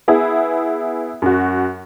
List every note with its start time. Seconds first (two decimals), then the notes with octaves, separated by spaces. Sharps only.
0.08 B3 E4 G#4
1.22 F#2 F#4